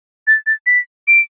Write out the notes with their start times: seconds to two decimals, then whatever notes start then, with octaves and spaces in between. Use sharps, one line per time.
0.27 A6
0.47 A6
0.66 B6
1.08 D7